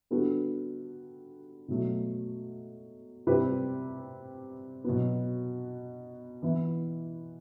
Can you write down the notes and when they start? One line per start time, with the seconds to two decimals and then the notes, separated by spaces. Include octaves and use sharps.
0.11 D3 G3 B3 F#4 A4
1.68 B2 F#3 A3
3.27 C3 G3 C4 G4 B4
4.84 B2 F#3 B3
6.42 E3 B3 E4